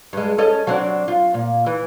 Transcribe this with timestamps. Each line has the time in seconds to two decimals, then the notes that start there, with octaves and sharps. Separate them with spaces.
0.13 G2 G#3
0.38 C#4 A4 D#5
0.67 F#3 C4 D4
1.08 F4
1.34 A#2
1.66 E3